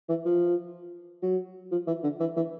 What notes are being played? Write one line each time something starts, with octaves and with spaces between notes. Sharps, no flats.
E3
F3
F#3
F3
E3
D3
E3
E3